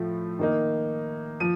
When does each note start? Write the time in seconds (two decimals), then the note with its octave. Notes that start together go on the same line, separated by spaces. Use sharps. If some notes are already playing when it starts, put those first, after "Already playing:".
Already playing: A2 F3 A3
0.39 D#3 A#3 D#4
1.40 F3 D#7